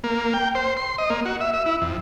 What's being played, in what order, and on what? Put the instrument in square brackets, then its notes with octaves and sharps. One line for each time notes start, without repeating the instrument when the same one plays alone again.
[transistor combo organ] A#3
G5
C5
C6
D#5
A#3
F#4
E5
E5
E4
F2